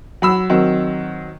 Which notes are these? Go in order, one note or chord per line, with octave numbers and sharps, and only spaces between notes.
F#3 B5 E6
D#3 F#3 C4